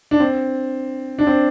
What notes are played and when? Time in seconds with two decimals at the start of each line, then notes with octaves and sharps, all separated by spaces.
0.11 D4
0.20 C4
1.19 D4
1.27 C4